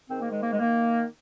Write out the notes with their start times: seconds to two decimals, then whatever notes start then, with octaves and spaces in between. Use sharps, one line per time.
0.09 G#2 D#3 C4
0.20 A#3
0.30 G#3
0.41 A#3
0.52 G#3
0.59 D#3 A#3